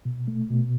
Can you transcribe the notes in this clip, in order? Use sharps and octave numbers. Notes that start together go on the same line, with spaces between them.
B2
A3
B2